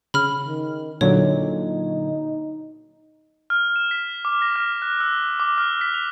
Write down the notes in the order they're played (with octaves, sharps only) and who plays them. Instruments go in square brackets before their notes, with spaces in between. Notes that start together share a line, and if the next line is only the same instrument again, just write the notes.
[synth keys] C#3 [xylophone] B5 F6
[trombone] D#3
[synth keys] A#2 D3 F#3 [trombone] D#4 [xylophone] C#5
[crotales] F6
E7
B6
D6
A#6
F6
F#6
E6
D6
F6
B6
F7